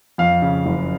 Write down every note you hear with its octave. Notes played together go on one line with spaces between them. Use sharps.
F2 F5
C#3
F#1